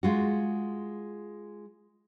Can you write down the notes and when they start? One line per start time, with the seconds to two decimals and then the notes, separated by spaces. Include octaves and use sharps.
0.03 G#3 F4 F#4